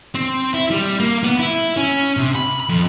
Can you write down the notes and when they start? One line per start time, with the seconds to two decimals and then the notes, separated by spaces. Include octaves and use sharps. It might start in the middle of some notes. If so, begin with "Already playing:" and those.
0.15 C4
0.54 E4
0.70 G3
1.00 A#3
1.23 B3
1.39 E4
1.77 C#4
2.17 C3
2.35 B5
2.69 F2